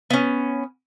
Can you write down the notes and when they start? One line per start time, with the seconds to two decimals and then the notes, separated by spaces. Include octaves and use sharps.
0.10 B3 C#4